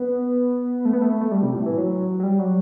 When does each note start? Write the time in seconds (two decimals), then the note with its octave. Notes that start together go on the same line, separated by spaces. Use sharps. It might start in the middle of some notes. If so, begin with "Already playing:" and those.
Already playing: B3
0.85 A3
0.93 B3
1.01 A3
1.21 A3
1.31 G3
1.43 C3
1.54 A2
1.66 E3
1.78 F#3
2.20 F#3
2.23 G3
2.39 F#3